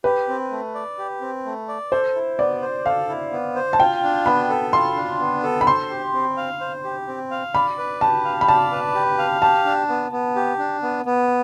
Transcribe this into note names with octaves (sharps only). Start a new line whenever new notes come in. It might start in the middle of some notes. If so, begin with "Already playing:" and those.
G4 B4
C4
A3
D5
G4
C4
A3
D5
A4 C5
E4
B3 D5
C5
A4 F5
E4
B3
C5
A5
F4 G5
D4
B3 B5
A4
F4 C6
D4
B3
A4
B5
C5 C6
G4
C4
F5
C5
G4
C4
F5
D5 B5
B4
G4 A5
F5
B5
D5 A5
B4
G4
F5
G4 A5
D4
B3
B3
G4
D4
B3
B3